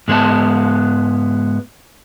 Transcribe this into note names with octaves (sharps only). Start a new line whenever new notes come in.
G#2 G#3 B3 A5